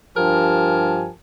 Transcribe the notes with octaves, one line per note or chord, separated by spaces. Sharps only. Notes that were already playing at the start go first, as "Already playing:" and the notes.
G2 F3 G4 A#4 G#5 A5